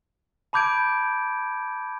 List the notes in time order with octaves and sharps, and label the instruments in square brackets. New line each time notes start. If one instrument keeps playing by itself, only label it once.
[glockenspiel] A5 B5 D6 G6 G#6 D7